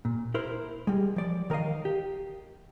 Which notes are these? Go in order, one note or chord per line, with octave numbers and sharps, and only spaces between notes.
A#2
E4 A#4 C5
G3 G#3
F3 D5
D#3 A#4 D5 D#5 F5
G4